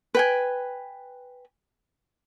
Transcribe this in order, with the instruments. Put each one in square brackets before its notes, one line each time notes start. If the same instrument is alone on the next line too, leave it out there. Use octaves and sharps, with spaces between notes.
[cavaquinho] B4 G5 G#5